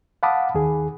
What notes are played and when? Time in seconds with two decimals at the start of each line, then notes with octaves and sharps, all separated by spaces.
0.23 F5 F#5 A5 B5 D6 D#6
0.54 D#2 D#3 G#4